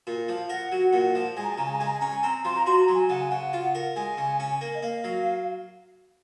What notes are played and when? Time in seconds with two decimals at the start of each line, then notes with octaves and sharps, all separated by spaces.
0.07 A#2
0.28 F3 F5
0.49 A#4 F#5
0.72 F#3
0.93 A#2
1.15 F3
1.37 G#3 G#5
1.43 A#5
1.51 G#5
1.58 C#3 A#5
1.66 G#5
1.72 A#5
1.79 G#3 G#5
1.86 A#5
1.93 G#5
2.00 C#4 A#5
2.08 G#5
2.23 C4 A#5
2.45 F3 C6
2.56 A#5
2.66 F#4 C6
2.81 A#5
2.88 F#3
2.95 G#5
3.09 C#3 F#5
3.20 G#5
3.30 C#3 F#5
3.53 F4
3.75 A#4
3.96 G#3 G#5
4.18 C#3
4.40 C#4
4.61 A#3
4.75 D#5
4.82 A#3 F5
5.04 F#3